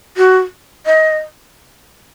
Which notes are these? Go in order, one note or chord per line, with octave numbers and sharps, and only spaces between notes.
F#4
D#5